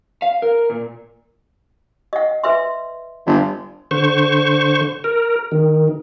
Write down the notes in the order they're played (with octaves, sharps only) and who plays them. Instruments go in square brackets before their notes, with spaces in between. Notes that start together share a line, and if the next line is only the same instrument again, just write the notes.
[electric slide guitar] F5
A#4
A#2
[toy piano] D#5 F#5
B4 E5 C6
[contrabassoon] G1
[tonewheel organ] D3 C5 C#6
A#4
D#3